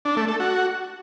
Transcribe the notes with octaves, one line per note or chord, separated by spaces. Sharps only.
D4
A3
A4
F#4